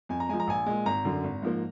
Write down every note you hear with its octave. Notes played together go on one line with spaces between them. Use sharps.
F2 G#5
A#5
F3 G#3 G#5
A#5
A#1 G#5
A#2 G#3
G#1 A#5
F#2 D3
G#1
G#2 F3 A#3